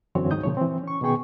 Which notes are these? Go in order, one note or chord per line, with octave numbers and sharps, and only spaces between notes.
F#2 D3 E3 C4 F#4 C#5
D2 G#2 D#3 D#4 D#6 G6
A#2 C#3 F3 C#5
E3 C4
C#4 C#6
B2 D#3 B3 G#4 G5 C#6